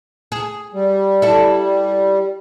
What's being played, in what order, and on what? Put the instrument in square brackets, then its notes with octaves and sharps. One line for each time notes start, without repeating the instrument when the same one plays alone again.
[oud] G#4
[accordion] G3
[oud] E4 A4